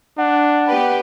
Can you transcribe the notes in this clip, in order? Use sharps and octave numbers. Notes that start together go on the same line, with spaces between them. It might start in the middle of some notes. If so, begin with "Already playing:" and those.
D4 F#5
B3 G4 B4